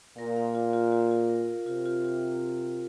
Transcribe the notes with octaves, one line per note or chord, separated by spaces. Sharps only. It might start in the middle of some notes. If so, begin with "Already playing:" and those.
A#2 A#4
F5
F4
F4
F4
F4
A#4
F4
C3 F4
F4
F4